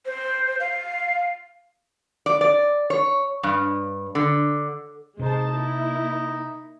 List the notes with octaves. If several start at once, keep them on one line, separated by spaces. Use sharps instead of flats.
C5
F5
D5
D5
C#5
G2
D3
C3 G#3 D#4 C5 A5
A#3 E4